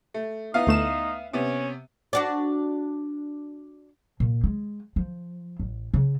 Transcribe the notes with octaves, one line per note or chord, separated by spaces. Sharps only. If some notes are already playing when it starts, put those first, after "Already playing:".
A3
B3 D#4 E4 F5
D2 A3 E7
C3 B3 C#4
D4 F#4 D5
A#2
G#3
F3
A1
C#3